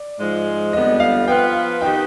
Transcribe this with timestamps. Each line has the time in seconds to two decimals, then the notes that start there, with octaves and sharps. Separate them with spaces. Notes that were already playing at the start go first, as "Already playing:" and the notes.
Already playing: D5
0.18 G#2 F3 G#3
0.73 F2 D3 G3 B3 D#5
1.00 F5
1.28 F3 B3 F4 B4 G5
1.81 D#3 B3 D#4 G4 B4 G5